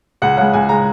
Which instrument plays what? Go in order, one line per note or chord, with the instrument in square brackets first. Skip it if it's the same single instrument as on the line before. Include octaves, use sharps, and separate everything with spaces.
[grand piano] C#2 F#5
C#3 G#3 F#5
C#2 G#5
C#3 G#3 A#5